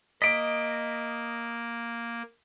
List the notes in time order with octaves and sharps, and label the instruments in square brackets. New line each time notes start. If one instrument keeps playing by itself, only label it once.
[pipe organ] A#3 [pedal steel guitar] D#5 [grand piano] B6 D7